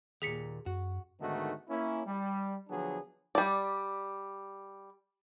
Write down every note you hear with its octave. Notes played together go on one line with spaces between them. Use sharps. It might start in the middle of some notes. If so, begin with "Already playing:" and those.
D#2 A#2 G#4 B6 C#7
F#2 F#4
G#2 D3 D#3 A3 B3 F#4
A#3 C#4 E4
G3
D3 F3 F#3 B3 D4 G#4
G3 D5